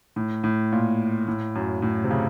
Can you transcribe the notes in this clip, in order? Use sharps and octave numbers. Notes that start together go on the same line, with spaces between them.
A2
A2
A#2
A2
F#2
A2
C3
C#3